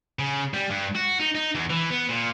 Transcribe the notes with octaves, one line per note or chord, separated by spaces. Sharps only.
C#3
G3
G2
F#4
D#4
D#4
E2
E3
B3
A#2